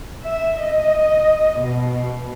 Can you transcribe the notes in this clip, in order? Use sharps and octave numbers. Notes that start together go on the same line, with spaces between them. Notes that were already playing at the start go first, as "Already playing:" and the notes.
E5
D#5
B2